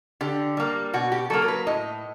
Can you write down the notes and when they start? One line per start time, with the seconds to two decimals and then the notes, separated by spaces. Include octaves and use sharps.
0.21 D3 G4
0.57 G3 A#3
0.94 B2 F#4
1.12 G4
1.30 F#3 A#3 A4
1.42 A#4
1.48 B4
1.67 A2 D#5